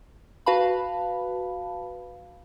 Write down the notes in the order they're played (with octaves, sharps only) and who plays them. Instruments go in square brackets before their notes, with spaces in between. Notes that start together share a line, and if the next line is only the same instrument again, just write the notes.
[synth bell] F#4 B4 F5 A5 B5